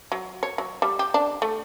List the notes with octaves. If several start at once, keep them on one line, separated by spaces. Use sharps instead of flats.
F#3
C#5
F#3
G3
G4
D4
A3